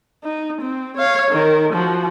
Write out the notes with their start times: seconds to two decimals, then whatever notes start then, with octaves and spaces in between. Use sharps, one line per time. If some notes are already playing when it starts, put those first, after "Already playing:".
0.24 D#4
0.61 C4
0.97 C#5 F5
1.31 D#3 A#4
1.73 F3 F#4